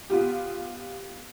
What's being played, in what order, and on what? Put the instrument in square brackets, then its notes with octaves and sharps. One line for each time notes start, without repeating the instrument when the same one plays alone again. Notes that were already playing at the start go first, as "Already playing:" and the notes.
[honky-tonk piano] B3 F4 G4